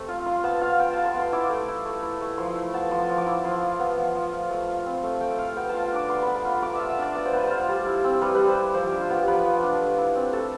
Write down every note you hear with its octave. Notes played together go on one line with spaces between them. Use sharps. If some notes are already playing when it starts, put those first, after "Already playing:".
Already playing: A3 C4
F4
F4 C6
B3 A5
F4 F5
B3 G5
F4 A5
C6
B3
C6
E4 D6
A3
E4
A3
E4
A3
F3 C6
E4
B3 A5
F3 C6
F3
D6
E4
F3 C6
F4
B3
F3
F3
F4
A3
F4
C4
A3
A3 G5
F4 F5
B3 G5
A5
F4
A5
D4 D6
B3 C6
B3 B5
B5
F4 C6
B3 D6
F4 E5
E5
D4 D5
B3 D5
C5
B3 B4
F4 C5
G3
E4
C4
G3 B4
G3 B4
C5
E4
F3 C5
D4 G4
F4
B3 G4
F3 B4
F3
D4
A3
E4
C4
A3 A4